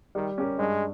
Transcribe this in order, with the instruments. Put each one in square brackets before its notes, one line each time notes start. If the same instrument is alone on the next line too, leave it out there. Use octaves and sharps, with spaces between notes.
[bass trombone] D#3 [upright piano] G3
[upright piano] C#4 G4 A#4
[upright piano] G2 [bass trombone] G#3